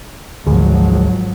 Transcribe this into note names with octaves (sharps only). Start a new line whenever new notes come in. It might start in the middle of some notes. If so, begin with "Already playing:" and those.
G#1 D2 F3 F#3 G#4